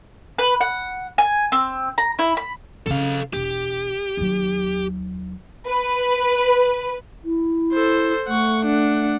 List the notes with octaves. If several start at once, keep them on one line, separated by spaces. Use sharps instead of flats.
B4
F#5
G#5
C4
A#5
E4
B5
C#3 C#4 A4 F5
E1 G4
D#2 F#3
B4
E4
A4 C5
A3 F#5 C#6
D4 F#5